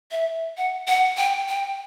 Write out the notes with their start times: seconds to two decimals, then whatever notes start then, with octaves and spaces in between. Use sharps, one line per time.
0.11 E5
0.57 F#5
0.88 F#5
1.17 G5
1.48 G5